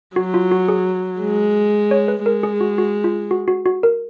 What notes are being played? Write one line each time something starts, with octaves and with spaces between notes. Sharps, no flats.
F#3 F#4
F4
F#4
G#4
G#3
C#5
B4
G#3 A#4
G#4
F#4
F#4
F4
F#4
F#4
F#4
A#4